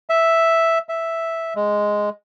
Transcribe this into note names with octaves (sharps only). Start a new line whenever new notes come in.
E5
E5
G#3